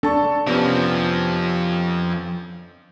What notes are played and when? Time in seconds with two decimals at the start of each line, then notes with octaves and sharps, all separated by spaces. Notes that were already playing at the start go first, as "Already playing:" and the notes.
0.03 D4 A4 A5 C#6
0.47 F2 C3 F3 B3 C#4